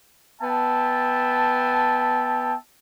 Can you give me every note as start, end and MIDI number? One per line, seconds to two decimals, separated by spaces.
0.42 2.56 59
0.42 2.56 76
0.42 2.56 79
0.42 2.56 81